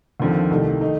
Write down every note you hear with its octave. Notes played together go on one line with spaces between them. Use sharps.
D#2 D3 F3 C4
C2 C3 D#3 A3
D#3 A3 D#4